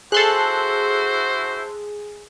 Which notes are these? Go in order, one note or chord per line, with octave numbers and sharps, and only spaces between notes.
E4 F#4 G#4 A4 C5 C6 F#6